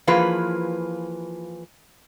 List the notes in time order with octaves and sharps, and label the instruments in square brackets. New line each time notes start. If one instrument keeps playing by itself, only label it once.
[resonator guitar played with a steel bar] E3 F3 A#3 F4 G#4 B4